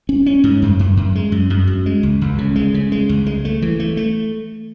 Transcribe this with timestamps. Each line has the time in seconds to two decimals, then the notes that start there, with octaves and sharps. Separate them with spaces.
0.09 C#4
0.26 C#4
0.44 G#2
0.62 F#2
0.79 F#2
0.97 F#2
1.15 G#3
1.32 F#2
1.50 F#2
1.68 F#2
1.86 G#3
2.03 C#2
2.21 C#2
2.38 C#3
2.56 G#3
2.74 C#3
2.92 G#3
3.09 C#2
3.26 G#3
3.45 A3
3.62 E3
3.80 A3
3.97 A3